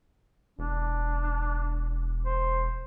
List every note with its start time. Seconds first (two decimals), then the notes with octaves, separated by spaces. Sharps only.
0.59 E1 D4
2.25 C5